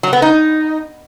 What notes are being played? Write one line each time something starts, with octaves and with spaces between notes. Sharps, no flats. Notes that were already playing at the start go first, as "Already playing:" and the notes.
F#3
B3
D#4